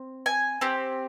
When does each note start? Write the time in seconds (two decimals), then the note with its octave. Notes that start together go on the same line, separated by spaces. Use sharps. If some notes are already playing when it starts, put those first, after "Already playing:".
Already playing: C4
0.26 G#5
0.61 C4 G4